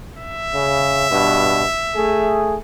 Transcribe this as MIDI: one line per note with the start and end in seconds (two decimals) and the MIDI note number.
0.18 2.50 76
0.54 1.08 49
1.09 1.63 43
1.09 1.63 47
1.95 2.56 57
1.95 2.56 68